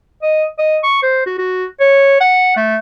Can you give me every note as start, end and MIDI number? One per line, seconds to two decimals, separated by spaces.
0.23 0.45 75
0.59 0.78 75
0.83 0.99 85
1.03 1.22 72
1.26 1.34 66
1.38 1.65 66
1.80 2.20 73
2.21 2.55 78
2.57 2.77 57